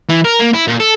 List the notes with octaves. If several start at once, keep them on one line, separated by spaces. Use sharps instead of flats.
E3
A#4
A#3
E4
A#2
A4